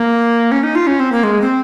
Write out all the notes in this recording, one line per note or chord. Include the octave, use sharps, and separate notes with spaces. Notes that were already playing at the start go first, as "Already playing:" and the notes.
Already playing: A#3
C#4
D#4
F4
C#4
C4
A#3
G#3
C4